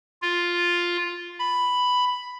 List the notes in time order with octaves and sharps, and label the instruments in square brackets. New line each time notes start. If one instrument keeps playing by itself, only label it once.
[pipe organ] F4
B5